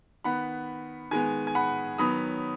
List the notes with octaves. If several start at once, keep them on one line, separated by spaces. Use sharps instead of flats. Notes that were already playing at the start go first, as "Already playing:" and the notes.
D#3 B3 F#5 B5
D#3 G#3 B3 G#5
G#5
F#5 B5
D#3 F#3 B3 B5 D#6